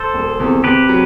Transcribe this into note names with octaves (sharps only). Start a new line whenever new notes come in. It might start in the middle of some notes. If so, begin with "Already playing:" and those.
Already playing: A4 C5
E1
E2 C3
C3 G4 B4
F#3